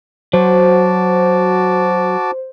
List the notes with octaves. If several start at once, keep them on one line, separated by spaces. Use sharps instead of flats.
F#3 F#4 C5 A5 D6